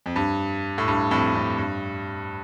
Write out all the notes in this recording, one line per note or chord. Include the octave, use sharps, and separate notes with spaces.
F2
G2
A2
G2
F2 A2
F2
G2